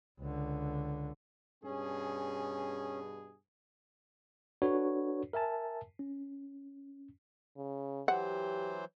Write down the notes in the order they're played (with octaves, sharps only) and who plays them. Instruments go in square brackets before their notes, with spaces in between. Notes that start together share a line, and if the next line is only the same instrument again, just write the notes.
[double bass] C#2 D3
[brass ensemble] G2 B2 G#4 [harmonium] C#4
[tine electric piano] D4 F#4 A4 B4 C#5
A#4 E5 G#5 A5
C#4
[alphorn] C#3
[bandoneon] E3 F#3 C5 [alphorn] G4 [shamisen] F#5